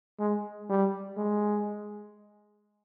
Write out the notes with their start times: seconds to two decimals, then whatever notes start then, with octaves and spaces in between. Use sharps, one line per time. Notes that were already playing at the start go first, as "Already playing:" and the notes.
0.19 G#3
0.69 G3
1.17 G#3